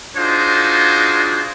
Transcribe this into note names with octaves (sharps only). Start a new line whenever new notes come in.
D4 D#4 F4 F#4 G#4 C5